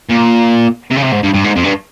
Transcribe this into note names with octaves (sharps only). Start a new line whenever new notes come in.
A#2
C3
C#3
C3
G#2
G2
G2
G#2
F2
G2